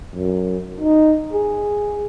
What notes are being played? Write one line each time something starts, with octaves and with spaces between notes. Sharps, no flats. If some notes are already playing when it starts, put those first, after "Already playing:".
F#2
D#4
G#4